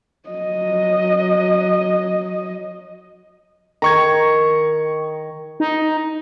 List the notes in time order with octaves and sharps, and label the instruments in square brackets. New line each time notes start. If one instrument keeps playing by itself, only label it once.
[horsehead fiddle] F#3 D#5
[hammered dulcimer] D#3 [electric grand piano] A#5 C#6 G#6
[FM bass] D#4